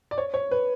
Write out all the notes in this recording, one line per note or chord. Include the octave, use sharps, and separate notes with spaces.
D5
C#5
C#5
B4